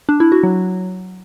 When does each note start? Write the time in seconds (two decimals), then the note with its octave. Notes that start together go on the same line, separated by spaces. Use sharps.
0.09 D4
0.20 E4
0.32 F#4
0.43 F#3